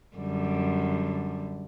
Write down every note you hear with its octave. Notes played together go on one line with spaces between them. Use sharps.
F#2 D3 G3